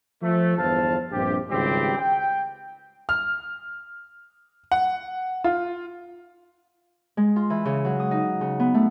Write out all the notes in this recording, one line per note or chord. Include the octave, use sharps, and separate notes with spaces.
F3 A3
G1 E2 C5 F5 A5
A#1 G2 C4 G4
G#1 C#2 G3 C4 G4
G5
F6
F#5
F4
G#3
F4
E3
C#3
F#3
D#6
D#4
C#3
B3
A3